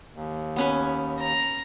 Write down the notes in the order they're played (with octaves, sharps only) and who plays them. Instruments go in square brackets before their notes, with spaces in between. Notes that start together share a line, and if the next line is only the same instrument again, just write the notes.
[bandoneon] D#2
[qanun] B3 C#4 B4
[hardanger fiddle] A#5